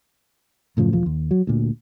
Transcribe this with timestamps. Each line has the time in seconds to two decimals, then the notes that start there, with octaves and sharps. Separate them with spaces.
0.77 F#2 A2 C#3 F3
0.93 E1 F3
1.06 D#2
1.31 F#3
1.47 D2 A#2